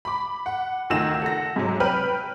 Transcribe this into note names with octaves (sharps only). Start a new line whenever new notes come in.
B5 D6
F#5
D2 D#3 F4 E6 A#6 E7
A4 F#5 A#6
G#2 C3 F#3
B4 G5 F6 F#7